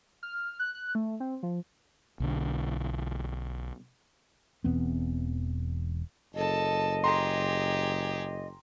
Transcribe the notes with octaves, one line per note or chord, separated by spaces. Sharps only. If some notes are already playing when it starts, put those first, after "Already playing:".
F6
F#6
F#6
A3
C4
F3
B1 D3
E1 E2 B3 C4
F#1 A4 D#5 A5
G4 G#4 A#5 C6